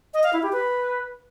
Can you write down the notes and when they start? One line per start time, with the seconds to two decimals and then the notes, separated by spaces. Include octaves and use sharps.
0.14 D#5
0.23 F5
0.33 E4
0.43 G4
0.53 B4